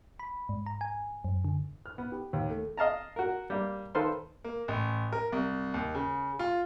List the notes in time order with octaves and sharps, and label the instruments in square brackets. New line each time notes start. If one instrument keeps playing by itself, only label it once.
[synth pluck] B5
G#2
A#5
G#5
F#2
D3
[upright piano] F6
B3
G4
D#2
A3
[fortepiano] D#5 F5 A5 A#5
F#4 A#4
G3 A#3
D#3 A4 B4 C5 F5 C6
[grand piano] A#3
A1
A#4
C2
D#2
C#3
F4